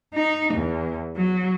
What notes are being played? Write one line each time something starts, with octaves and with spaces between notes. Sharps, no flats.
D#4
E2
F#3